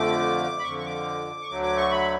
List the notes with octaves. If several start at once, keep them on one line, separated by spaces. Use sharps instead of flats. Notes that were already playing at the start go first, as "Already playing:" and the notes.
Already playing: F2 D3 F3 A3 D6
B5
F2 D3 F3 C#6
C#6
D6
C#6
D2 D3 F#3 A3 D6
D6
C#6
B5